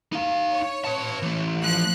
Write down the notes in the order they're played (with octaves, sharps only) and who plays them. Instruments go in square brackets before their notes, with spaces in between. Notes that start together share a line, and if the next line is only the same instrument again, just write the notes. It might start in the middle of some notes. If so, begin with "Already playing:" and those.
[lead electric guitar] D#4 F5
[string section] C#5
[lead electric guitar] B4 A5
E3 A3
[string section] F3 F#6